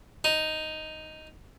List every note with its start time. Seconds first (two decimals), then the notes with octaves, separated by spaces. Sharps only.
0.24 D#4